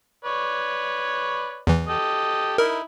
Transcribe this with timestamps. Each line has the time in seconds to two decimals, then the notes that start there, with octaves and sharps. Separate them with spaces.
0.25 B4 C#5 D5
1.67 E2 E3
1.88 G4 A4 D#5
2.58 D#4 E4 A#4